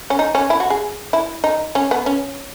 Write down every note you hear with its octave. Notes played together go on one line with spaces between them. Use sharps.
C#4
D#4
C#4
E4
F#4
G#4
E4
D#4
C#4
B3
C#4